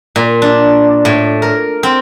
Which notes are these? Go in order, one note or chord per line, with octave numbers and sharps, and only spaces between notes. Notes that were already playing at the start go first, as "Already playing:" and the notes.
A#2
D4
A2
A#4
C4